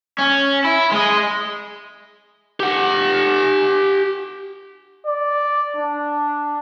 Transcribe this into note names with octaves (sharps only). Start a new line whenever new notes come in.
C#4
E4
G#3 D#5
G4 F#5
D5
D4